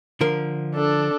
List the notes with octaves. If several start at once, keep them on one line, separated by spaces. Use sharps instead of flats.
D3 F3 A#4
D4 A4